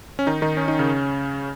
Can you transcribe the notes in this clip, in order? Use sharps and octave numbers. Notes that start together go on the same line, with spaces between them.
C#4
D#3 D#4
D#3 D#4
C#4
D#4
C#3 C#4